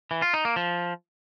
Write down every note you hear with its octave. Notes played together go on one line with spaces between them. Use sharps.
E3
F4
D#4
A#3
F3